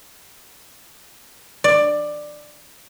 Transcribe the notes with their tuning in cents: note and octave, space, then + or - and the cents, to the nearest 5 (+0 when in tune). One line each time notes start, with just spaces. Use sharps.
D5 +15